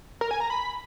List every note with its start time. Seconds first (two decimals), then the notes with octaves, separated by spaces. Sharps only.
0.21 A#4
0.31 G#5
0.40 A#5
0.50 B5